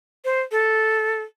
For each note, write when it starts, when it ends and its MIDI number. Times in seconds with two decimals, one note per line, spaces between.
0.25 0.41 72
0.52 1.22 69